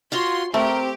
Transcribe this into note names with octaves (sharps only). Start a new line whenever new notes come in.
F4 F#4 C#5 C6
A3 C4 G4 A#4